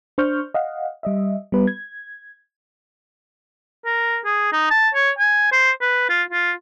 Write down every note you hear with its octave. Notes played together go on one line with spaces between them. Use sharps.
D4 C5 C#6 F6 G6
D#5 F5 F#5
G3 D#5 E5
G3 B3 B4
G#6
A#4
G#4
D#4
A5
C#5
G#5
C5
B4
F4
F4